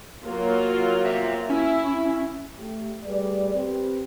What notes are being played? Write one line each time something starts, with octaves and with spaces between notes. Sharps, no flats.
F#3 A#3 F4
C5 E5
C#4 E4
A3 G4
G3 A3 G#4 B4 D5
C4 G4 B4